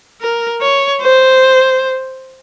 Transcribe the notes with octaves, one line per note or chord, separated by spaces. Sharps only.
A#4
C#5
C5